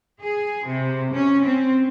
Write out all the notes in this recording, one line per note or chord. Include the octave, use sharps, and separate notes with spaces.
G#4
C3
C#4
C4